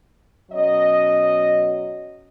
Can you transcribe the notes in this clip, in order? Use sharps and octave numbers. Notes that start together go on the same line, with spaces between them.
B2 F#3 C#4 D#5